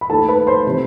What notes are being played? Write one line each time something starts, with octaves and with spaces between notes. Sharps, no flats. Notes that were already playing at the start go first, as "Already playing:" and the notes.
B5
D#2 D#3 A3 A4 A5
B4 B5
C5 C6
C3 E3